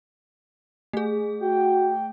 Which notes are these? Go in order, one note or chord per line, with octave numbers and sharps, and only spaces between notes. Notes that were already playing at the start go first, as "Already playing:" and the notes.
A3 G#4
F#4 G5